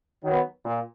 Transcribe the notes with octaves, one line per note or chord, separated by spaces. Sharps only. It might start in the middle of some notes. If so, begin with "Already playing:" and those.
D#3 F#3 B3
A#2